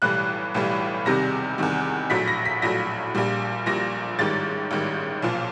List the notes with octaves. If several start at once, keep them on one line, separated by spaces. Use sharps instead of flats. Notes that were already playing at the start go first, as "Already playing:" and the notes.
B1 A2 E3 G3 F#6
B1 A2 E3 G3
E2 C3 D#3 G3 A#6
E2 C3 D#3 G3
A#1 A2 F#3 B6
A#6
B6
A#1 A2 F#3 A#6
A#1 A#2 G3
A#1 A#2 G3 A#6
A1 G#2 D#3 G3 A6
A1 G#2 D#3 G3
B1 A#2 F3